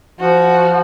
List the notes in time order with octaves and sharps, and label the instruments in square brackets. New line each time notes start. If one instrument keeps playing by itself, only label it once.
[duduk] F3 [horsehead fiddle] F#4